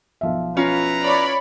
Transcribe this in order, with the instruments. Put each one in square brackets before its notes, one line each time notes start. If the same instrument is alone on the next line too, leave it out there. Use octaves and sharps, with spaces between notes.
[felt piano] B1 F3 E5
[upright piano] C#4 F4 [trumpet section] E4 B4 A#5
[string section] C#5 D5 B5